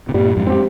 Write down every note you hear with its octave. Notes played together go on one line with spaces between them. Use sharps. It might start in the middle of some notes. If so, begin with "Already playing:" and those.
C3
G2 A#2 G3
F2 G#2
C4 G4